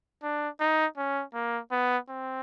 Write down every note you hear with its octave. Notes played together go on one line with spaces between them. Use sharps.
D4
D#4
C#4
A#3
B3
C4